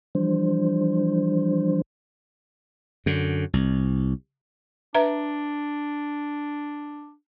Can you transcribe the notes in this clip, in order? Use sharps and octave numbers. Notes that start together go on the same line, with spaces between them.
E3 F3 G3 D4 C5
F#2 D3
C2
D4 B4 E5 A#5